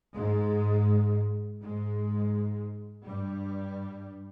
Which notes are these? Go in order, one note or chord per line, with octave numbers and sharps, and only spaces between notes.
G#2 G#3
G#2 G#3
G2 G3